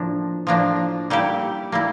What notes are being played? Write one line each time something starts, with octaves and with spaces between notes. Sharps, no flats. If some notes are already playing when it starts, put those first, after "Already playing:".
Already playing: A2 F3 A#3 D4
A2 F3 A#3 D4
G3 A#3 E4 G4
G3 A#3 E4